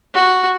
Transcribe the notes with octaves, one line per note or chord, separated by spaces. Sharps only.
F#4